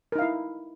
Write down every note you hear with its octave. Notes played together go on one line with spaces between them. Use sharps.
D#4 E4 A#4 F5